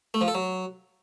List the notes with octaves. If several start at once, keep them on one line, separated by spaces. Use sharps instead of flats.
A3
F3
A4
F#3